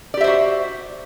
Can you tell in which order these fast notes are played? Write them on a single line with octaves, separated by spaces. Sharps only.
D5 G4 E5 C5 F#4